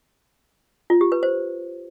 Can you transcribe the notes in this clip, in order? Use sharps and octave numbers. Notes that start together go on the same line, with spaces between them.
F4
G4
B4
C5